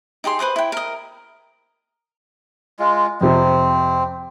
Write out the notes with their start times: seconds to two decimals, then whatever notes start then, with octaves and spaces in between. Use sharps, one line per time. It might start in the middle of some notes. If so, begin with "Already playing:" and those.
0.24 D#4 G4 G#4 C6
0.39 B4 C5 D6 D#6
0.56 E4 G5
0.72 A#4 D#5
2.79 G#3 F4
3.21 F2 C3 C4